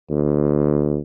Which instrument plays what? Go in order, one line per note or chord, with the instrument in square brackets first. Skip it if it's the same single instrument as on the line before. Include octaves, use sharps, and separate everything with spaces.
[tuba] D2